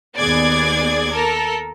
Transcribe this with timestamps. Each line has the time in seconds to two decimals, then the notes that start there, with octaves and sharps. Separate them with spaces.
0.18 D#2 B3 G#4 D5 D6 G#6
1.14 A4 A#4